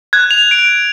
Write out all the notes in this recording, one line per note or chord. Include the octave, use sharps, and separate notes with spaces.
F#6 G#6
F7
D7